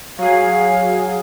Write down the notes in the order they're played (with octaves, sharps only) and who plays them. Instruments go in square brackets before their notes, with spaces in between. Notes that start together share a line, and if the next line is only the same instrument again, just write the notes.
[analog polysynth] F#3 G#4 [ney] F5